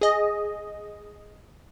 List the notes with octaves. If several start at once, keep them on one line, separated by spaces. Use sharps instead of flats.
G#4 D#5